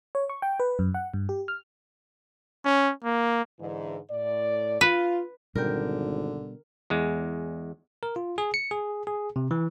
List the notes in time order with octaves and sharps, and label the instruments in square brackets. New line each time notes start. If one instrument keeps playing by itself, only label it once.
[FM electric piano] C#5
C#6
G5
B4
F#2
F#5
G2
G4
F6
[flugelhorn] C#4
A#3
[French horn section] G#2 D3 E3
A2 D5
[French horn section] F4 [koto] B4
[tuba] G#1 [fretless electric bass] B2 G3 D4 [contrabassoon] D3 [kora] A#4 G5
[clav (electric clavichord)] E2 G#3
[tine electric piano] A#4
F4
G#4
C#7
G#4
G#4
C3
E3